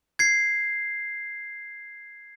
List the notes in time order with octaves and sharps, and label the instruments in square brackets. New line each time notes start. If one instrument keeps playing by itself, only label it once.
[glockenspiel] G#6 C7